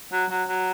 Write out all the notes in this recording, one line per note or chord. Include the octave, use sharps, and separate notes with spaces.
F#3
F#3
F#3